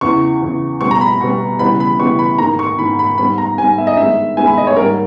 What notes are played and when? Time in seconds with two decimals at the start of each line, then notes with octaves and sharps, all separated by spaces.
0.01 E2 C#3 E3 C#6
0.42 E2 C#3 E3
0.81 B2 G3 B3 C#6
0.91 A#5
1.01 B5
1.20 B2 G3 B3 C#6
1.59 C#3 E3 G3 B3 B5
1.80 B5
2.00 C#3 E3 G3 B3 C#6
2.19 B5
2.38 G#2 D#3 A#3 A#5
2.59 C#6
2.79 G#2 D#3 A#3 B5
2.99 B5
3.18 G#2 G3 B3 B5
3.38 A#5
3.58 G#2 G3 B3 G#5
3.78 E5
3.87 D#5
3.97 G2 D#3 G#3 B3 E5
4.37 G2 D#3 G#3 B3 G#5
4.47 B5
4.58 D#5
4.67 C#5
4.77 G#2 G3 A#3 A#4